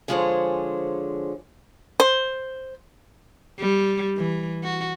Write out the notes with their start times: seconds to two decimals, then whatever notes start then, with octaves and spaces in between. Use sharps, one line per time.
0.08 D3 F3 G#3 G#4 C5 C#5
2.00 C5
3.60 G3
4.17 E3
4.63 F#4